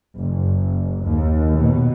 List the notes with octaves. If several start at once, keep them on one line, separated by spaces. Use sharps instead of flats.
F#1
D#2
B2